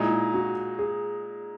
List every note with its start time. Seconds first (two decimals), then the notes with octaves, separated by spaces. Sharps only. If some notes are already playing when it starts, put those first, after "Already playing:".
Already playing: A#2 G#3 D#4 E4
0.34 F#4
0.79 G#4